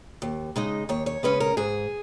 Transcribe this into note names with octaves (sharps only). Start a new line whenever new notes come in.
D#2
C#3 G#3 D#4
D#2 C#5
C#5
C#3 G#3 C#4 B4
A#4
G#2 G#4